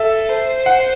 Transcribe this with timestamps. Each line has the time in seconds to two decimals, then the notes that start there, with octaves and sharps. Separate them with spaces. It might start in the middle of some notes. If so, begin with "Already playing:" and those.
Already playing: A4 E5
0.29 C5
0.66 F#5